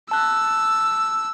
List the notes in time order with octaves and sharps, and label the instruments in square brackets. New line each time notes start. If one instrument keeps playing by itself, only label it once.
[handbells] A5 F#6 [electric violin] E6